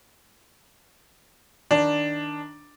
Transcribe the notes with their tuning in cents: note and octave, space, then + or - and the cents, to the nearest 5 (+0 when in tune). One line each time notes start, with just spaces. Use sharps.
D#3 +0 D4 +0